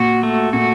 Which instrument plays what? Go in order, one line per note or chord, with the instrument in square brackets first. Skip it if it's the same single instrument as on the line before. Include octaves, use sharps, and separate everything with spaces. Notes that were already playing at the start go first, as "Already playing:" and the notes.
Already playing: [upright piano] A#2 [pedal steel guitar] F#4
[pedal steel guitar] A3
[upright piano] A#2 [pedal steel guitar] F#4